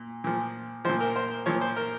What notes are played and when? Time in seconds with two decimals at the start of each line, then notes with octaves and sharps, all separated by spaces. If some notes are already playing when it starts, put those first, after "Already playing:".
Already playing: A#2
0.24 A#2 F3
0.85 F3 C5
0.89 A#2
1.00 A#4
1.16 C5
1.46 A#2 F3 C#5
1.61 C5
1.77 A#4